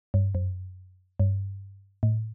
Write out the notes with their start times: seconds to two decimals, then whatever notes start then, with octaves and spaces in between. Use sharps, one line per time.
0.14 G2
0.35 F#2
1.20 G2
2.03 A2